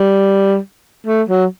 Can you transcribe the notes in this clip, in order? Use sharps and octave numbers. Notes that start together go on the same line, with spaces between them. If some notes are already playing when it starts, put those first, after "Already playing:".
Already playing: G3
A3
F#3